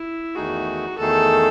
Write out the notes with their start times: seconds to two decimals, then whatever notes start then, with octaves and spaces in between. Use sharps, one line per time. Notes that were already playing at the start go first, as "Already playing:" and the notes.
Already playing: E4
0.35 E2 D#3 A3 D#4 F#4 G#4
0.98 E2 D#3 A3 D#4 G#4 A4